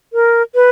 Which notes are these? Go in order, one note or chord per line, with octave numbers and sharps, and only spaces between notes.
A#4
B4